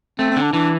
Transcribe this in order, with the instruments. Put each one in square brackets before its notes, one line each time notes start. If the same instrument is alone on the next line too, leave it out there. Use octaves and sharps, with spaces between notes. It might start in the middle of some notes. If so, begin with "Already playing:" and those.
[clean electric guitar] A3 [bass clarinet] C4
[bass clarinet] C4
[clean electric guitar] D3
[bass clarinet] D4
[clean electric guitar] E3 [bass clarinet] D4